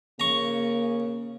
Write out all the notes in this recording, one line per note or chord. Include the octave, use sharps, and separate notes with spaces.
C#3 A#3 A#5 C#6